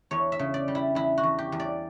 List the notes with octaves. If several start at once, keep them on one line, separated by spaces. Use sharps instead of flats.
E2 C#5
E5
C#3
D5
G3
E4
E2 E4
F#4
E2
G4
E2
D5